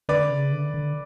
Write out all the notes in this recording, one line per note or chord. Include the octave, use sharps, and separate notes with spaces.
D3 B4 D5
C#3
D3
D3